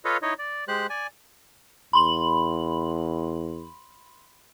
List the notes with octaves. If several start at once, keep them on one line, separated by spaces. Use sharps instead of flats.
F4 A4 B4 C#5 D#5 F5
D#4 E4 C#5 D#5
D5
G#3 G4 C5 F#6
D5 G#5
E2 B5 C6 F#7